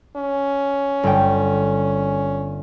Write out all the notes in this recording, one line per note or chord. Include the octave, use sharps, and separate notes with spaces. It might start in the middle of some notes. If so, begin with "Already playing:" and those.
C#4
G1 G5